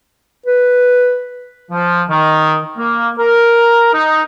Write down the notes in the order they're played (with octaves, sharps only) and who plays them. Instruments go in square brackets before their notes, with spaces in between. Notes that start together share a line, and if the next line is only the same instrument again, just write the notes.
[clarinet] B4
[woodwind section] F3
D#3
A#3
A#4
D#4